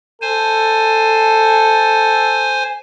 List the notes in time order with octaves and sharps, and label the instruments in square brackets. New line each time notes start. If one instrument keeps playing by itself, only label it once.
[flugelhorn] A4 [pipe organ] C5 G#5